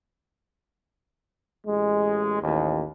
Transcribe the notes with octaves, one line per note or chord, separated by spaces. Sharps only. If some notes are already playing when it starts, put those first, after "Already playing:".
A1 G#3
A1 D#2